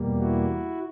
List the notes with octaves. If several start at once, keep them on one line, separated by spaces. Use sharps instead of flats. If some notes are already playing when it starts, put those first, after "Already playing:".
Already playing: E2 B2 G3 A#3
E4 F#4